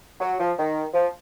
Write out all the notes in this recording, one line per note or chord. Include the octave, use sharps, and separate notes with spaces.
F#3
F3
D#3
F3